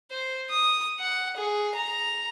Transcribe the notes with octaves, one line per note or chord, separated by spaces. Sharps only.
C5
D#6
F#5
G#4
A#5